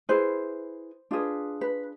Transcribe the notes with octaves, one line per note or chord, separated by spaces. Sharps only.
E4 G#4 B4 C5
D4 F4 G#4 B4
B4